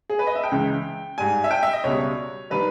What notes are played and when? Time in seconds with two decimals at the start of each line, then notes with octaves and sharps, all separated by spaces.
0.10 G#4
0.19 B4
0.27 D#5
0.35 E5
0.43 G5
0.52 C#2 C#3 E3 G#3
1.18 G#2 G3 G#5
1.44 E5
1.51 G5
1.63 E5
1.73 D#5
1.84 C#2 B2 G3 C#5
2.50 D#3 G3 B4